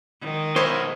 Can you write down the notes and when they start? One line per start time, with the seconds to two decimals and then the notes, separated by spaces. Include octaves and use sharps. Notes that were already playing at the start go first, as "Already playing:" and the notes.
0.21 D#3 G#3
0.56 B1 E4 A#4 C5 C#5 D#5